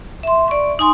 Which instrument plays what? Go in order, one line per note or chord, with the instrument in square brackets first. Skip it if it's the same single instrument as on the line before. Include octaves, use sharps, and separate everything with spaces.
[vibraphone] E5 C6
D5 C#6
D#4 G#5 C6